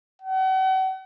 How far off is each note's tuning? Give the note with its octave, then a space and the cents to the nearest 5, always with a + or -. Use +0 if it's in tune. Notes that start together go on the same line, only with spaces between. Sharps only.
F#5 +40